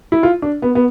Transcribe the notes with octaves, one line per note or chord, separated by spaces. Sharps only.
E4
F4
D4
B3
B3